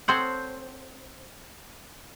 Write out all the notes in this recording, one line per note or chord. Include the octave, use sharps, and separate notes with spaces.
C4 A4 C5 C#5 F#5